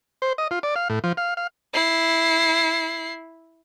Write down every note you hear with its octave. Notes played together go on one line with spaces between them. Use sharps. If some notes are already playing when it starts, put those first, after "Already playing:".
C5
D#5
F4
D5
F5
A2
F3
F5
F5
E4 C7